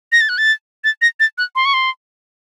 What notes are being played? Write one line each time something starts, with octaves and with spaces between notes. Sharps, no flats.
A#6
A6
F#6
A6
A6
A#6
A6
F#6
C6
C#6
C6